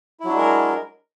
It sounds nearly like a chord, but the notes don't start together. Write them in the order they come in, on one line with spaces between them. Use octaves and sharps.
E4 F#3 D4 G#3 A#4